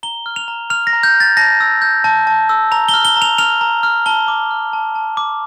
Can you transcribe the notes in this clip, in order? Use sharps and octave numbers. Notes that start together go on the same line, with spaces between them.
A#5 G7
F6
F7
A#5
F6 F7
A#6
A#5
G6
F6
A6
A5 A#6
E6
G6
A5
A5
E6
A#5 F7
G7
F6
G7
A#5
F7
F6 F7
A#5
F6
A5 G7
D6
F6
A5
A5
D6